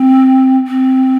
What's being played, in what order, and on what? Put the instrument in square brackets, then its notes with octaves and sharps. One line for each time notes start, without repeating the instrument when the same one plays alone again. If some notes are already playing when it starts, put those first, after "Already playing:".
Already playing: [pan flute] C4
C4